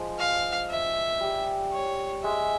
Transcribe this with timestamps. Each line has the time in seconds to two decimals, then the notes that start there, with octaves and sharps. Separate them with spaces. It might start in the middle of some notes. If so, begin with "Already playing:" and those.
Already playing: F3 G#3
0.18 F5
0.70 E5
1.21 G3
1.73 C#5
2.24 G#3 E5